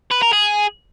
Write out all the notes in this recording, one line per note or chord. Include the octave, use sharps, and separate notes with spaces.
B4
A#4
G#4